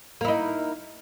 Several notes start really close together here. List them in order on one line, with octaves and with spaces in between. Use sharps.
A#3 E4 D#4